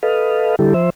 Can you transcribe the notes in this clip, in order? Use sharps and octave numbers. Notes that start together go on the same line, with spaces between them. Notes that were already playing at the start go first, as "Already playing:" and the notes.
A4 B4 D#5 F5
D3 G3 E4 G4 A4
F3 C5 E5